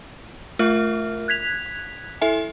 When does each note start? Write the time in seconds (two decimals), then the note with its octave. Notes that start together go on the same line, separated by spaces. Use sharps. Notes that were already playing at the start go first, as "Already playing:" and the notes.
0.59 A3 F4 A#4 E5 F6
1.28 F#6 G#6 B6 F7
2.21 E4 A4 E5 G#5